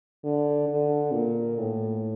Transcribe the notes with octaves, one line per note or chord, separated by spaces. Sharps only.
D3
D3
A#2
A2